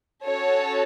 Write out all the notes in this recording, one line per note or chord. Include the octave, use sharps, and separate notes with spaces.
C#4 F#4 A4 C#5